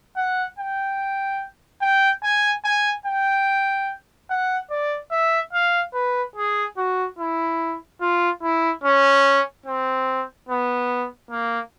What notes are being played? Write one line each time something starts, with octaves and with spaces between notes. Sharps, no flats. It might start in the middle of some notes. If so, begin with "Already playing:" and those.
F#5
G5
G5
G#5
G#5
G5
F#5
D5
E5
F5
B4
G#4
F#4
E4
F4
E4
C#4
C4
B3
A#3